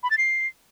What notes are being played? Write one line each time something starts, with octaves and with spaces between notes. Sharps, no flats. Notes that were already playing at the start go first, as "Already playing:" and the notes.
B5
A6
C7